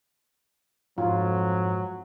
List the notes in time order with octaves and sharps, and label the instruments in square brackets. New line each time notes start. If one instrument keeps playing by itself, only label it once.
[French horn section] F2 F3 [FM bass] G#2 [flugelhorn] F#3 [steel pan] F4